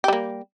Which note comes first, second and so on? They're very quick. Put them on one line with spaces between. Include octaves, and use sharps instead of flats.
G4 G3 A#3